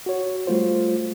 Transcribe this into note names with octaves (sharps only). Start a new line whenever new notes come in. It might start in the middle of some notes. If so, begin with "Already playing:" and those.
F#4 C#5
G3 A3 F4 C5